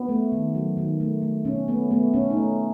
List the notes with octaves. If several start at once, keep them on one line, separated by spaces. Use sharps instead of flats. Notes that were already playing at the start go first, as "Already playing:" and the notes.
Already playing: B3
A3
D#3
F#3
D#3
A3
A3
B2 C#4
A3 B3
A3 B3
B2 C#4
D#4
A3